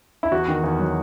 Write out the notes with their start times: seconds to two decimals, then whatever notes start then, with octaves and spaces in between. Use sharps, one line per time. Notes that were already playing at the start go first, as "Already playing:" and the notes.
0.23 E4
0.32 E2 F#4
0.48 D#3
0.64 E2
0.79 F#3